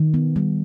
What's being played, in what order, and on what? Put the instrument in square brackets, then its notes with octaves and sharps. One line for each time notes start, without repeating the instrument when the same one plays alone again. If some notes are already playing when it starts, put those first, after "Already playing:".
Already playing: [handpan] D#3
B3
G3